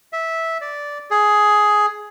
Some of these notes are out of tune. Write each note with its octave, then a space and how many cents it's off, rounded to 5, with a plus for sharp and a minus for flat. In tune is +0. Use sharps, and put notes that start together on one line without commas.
E5 -10
D5 -10
G#4 +10